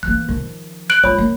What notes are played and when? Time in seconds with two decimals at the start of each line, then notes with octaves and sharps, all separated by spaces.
0.03 E3 A#3 F#6
0.28 D#3 F3
0.90 F#6 D7 F#7
1.04 G#3 F4 C#5 B5
1.18 A#3